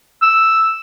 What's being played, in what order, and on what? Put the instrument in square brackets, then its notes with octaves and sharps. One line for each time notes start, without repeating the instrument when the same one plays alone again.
[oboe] E6